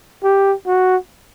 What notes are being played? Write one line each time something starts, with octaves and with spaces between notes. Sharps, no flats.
G4
F#4